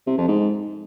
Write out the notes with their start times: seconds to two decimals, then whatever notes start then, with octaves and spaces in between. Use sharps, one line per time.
0.07 C3
0.17 F2
0.28 G#2